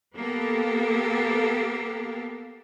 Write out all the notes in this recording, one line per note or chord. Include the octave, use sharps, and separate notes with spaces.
A#3 B3 G4 A4